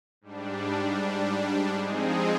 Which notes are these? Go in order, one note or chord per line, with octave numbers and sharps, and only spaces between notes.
G#2 G3 D4
F3 G#3 C4 D#4 G#4